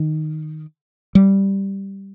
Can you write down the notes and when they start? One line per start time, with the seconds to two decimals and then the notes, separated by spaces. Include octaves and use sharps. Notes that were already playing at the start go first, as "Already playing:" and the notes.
Already playing: D#3
1.15 G3